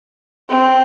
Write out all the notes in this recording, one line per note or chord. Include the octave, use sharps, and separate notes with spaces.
C4